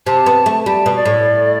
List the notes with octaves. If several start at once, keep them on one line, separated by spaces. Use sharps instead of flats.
C3 A5
B3
A3
G3 A5
B2
D5
A2